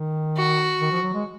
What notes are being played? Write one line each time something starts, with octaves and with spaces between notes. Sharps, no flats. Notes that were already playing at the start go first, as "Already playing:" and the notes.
Already playing: D#3
F#4
D#3
F3
F#3
G#3